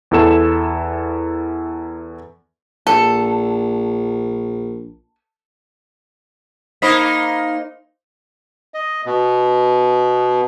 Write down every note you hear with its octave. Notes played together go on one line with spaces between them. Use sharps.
E2 E4 A4 E7
A#1 A4
A#3 D#4 C5 B5 D#6 B6
D#5
B2 B3